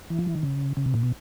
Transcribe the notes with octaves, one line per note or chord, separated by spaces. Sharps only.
E3
F3
E3
D#3
C#3
C#3
C3
A#2
B2